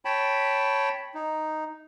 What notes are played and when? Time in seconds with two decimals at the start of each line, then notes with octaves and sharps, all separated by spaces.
0.05 C#5 G5 A5 B5
1.14 D#4